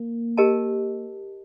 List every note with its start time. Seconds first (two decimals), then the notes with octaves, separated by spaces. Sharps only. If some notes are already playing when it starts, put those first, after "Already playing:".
Already playing: A#3
0.37 G4 A#4 D#5 A5